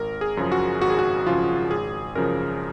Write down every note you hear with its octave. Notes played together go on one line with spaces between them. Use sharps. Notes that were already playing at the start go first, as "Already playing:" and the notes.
Already playing: G#1 A#4
G#4
F#2 C#3 F3
F#4
G#1 F#4
G#4
F#4
F#2 C#3 F3 F4
G#1 G#4
F#2 C#3 F3 A#4